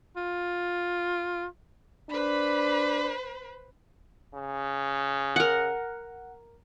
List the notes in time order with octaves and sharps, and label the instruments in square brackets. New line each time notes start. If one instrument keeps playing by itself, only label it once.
[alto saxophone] F4
[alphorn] D4 [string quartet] B4 C5 B5
[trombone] C#3
[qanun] A#4 F#5